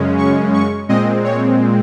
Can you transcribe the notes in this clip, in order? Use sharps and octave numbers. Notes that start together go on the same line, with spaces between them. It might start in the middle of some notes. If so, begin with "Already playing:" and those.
Already playing: F#2 C#3 G#3 C#4
C#6
C#6
A#2 G#3 C4 D#5
C#5